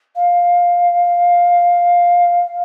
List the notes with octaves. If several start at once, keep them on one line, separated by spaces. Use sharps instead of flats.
F5